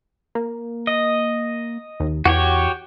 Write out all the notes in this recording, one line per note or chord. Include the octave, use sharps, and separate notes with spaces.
A#3
D#5
D#2
E2 F#4 G4 C#5